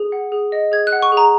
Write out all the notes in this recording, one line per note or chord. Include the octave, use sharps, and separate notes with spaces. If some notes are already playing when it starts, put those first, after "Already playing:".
Already playing: G#4
F#5
G#4
D#5
G#4 G#6
F#6
F#5
C#6
G#4
A#5